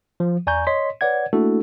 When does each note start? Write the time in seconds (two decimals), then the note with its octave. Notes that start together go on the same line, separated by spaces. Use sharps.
0.20 F3
0.47 E2 D5 G#5 A#5 C#6 G6
0.67 C#5 D#5 C6 B6
1.01 B4 C#5 D5 F#5 G#6
1.33 A3 A#3 D4 E4 F#4 A4